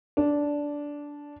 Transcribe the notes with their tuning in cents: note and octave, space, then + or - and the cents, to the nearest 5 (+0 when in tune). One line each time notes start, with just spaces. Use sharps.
D4 -10